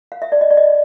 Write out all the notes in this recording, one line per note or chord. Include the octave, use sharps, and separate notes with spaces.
F5
E5
D5
D#5
D5
D#5